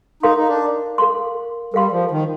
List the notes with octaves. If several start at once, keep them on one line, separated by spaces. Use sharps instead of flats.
D#4 A#4 F5 C6
D#4
D4
A#4 F5 C6
G3 A#4 F5 C6
F3
D#3